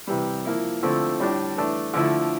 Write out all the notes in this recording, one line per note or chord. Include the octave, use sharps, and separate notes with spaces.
C3 E3 G3
F3 A#3 E4
D3 F3 A3 C4 E4
A2 G3 D4
E3 A3 D4
D3 F3 A3 E4